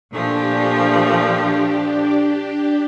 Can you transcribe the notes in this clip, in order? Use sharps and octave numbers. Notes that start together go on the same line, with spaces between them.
A#2 F3 A3 D4 G4